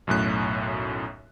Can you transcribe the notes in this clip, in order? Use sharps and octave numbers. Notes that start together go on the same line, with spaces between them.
B1 F#2 A2 F#6